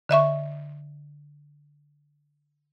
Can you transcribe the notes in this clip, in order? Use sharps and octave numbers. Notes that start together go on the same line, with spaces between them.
D3 D#5 E5 C#6